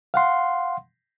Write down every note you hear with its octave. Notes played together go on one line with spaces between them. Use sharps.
F5 F#5 C6